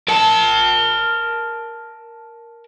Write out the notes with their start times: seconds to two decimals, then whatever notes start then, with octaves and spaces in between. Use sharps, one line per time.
0.08 A#4 A5